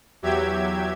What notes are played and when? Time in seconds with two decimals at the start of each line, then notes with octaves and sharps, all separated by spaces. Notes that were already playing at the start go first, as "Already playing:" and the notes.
0.22 E2 F#3 G4 E5 G#6